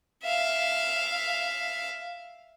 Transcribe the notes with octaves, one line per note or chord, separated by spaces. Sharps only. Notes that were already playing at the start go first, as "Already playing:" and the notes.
E5 F5